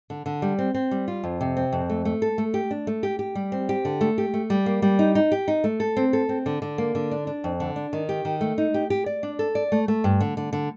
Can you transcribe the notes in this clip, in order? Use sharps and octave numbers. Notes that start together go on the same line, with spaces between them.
D3
D3
G3
C4
C4
G3
F4
F2
C3
C4
F2
A3
A3
A4
A3
G4
D4
A3
G4
G4
G3
C4
G4
D3
A3
G4
A3
G3
A#3
G3
D#4
D#4
G4
D#4
A3
A4
C4
A4
C4
D3
D3
A#3
D3
D4
D4
F2
D3
D4
D#3
G4
D#3
A3
D#4
G4
G4
D5
D4
A4
D5
A3
A3
G2
D3
D3
D3